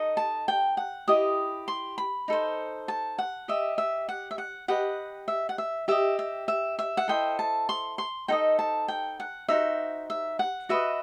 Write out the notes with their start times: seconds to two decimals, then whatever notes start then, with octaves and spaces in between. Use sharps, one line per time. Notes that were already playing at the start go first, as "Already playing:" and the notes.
Already playing: D#4 A4 D#5
0.17 A5
0.48 G5
0.77 F#5
1.08 E4 G4 D#5 D#6
1.68 C6
1.98 B5
2.28 D#4 A4 C5
2.88 A5
3.18 F#5
3.48 G4 D#5 E5
3.78 E5
4.09 F#5
4.31 E5
4.38 F#5
4.68 G4 B4 D#5 F#5
5.28 E5
5.49 F#5
5.58 E5
5.88 G4 D#5 E5
6.19 E5
6.48 E5
6.79 E5
6.97 F#5
7.08 E4 A4 C5 D#5 G5
7.39 A5
7.69 C6
7.98 C6
8.28 D#4 A4 C5 D#5 G5
8.59 A5
8.88 G5
9.20 F#5
9.48 D#4 F#4 C5 E5
10.10 E5
10.39 F#5
10.69 F#4 B4 D#5 E5